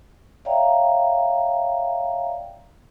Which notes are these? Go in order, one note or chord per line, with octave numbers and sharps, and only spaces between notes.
C#5 D5 E5 F5 G5 A#5